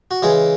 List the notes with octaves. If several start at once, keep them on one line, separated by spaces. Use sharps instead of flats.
F#4
C#3 E3 G#3 G#4